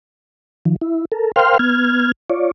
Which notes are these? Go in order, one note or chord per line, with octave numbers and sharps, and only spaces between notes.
D#3 F3
E4
A4 A#4
A#4 C5 F5 G5 C6 F6
B3 F6 G#6
F4 C#5 D5